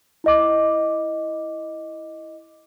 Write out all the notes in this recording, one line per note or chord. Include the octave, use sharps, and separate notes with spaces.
E4 D#5 D6